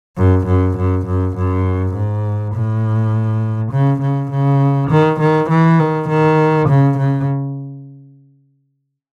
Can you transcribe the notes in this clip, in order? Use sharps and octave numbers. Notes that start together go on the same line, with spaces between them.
F#2
F#2
F#2
F#2
F#2
G#2
A2
C#3
C#3
C#3
D#3
D#3
E3
D#3
D#3
C#3
C#3